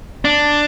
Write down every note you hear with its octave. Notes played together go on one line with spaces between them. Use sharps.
D4